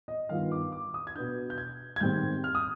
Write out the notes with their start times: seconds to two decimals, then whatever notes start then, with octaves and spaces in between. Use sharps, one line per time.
0.08 D#5
0.29 G2 D#3 B3 F4 F5
0.52 D6
0.72 D6
0.94 D#6
1.07 G#6
1.15 B2 B3 D4 G6
1.50 G6
1.58 G#6
1.96 G#6
2.00 G#2 D#3 G3 C4 G6
2.44 F6
2.55 D#6